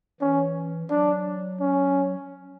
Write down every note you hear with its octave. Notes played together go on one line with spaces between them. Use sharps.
E3 C#4
F#3 D4
C#4